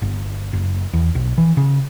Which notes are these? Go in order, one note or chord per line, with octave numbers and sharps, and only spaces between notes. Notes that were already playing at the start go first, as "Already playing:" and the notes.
G1
F#1
E2
B1
E3
C#3